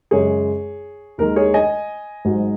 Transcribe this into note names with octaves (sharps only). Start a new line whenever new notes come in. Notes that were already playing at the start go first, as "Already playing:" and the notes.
F#2 C#3 G#3 G#4 C#5
D#2 D#3 G#3 A#4
G#4 C#5
D#5 G#5
G#1 G#2 F#3